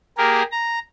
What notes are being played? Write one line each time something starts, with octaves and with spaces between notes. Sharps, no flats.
A#3 G4 G#4 A#4
A#5